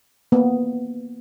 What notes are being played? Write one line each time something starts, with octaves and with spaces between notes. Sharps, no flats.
A#3 B3